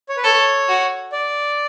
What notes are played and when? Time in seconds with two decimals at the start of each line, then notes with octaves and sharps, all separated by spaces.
0.09 C#5
0.17 B4
0.24 A4 C#5
0.68 F#4
1.12 D5